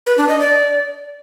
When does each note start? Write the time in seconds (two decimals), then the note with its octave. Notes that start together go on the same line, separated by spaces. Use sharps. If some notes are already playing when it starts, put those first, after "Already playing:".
0.07 B4
0.18 D4
0.29 D#5
0.40 D5